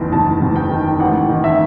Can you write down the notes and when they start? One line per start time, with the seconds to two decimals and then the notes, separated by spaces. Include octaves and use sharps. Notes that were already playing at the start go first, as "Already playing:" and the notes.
Already playing: F#1 E2 D#3
0.12 F#1 A5
0.42 F#1
0.56 G5
0.71 D#3
1.00 A1 F#5
1.29 D#3
1.44 E5